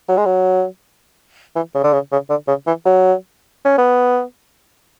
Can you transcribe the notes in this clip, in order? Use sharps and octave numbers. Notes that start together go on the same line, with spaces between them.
F#3
G#3
F#3
E3
C#3
D3
C#3
C#3
D3
C#3
E3
F#3
C#4
B3